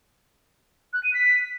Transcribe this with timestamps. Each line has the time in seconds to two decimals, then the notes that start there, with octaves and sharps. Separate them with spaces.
0.93 F#6
1.04 D#7
1.14 B6